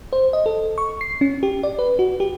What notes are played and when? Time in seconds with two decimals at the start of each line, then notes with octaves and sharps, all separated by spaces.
0.13 C5
0.33 D#5
0.46 A4
0.78 C#6
1.01 C7
1.21 C#4
1.43 G4
1.63 D5
1.79 B4
1.99 F#4
2.20 G4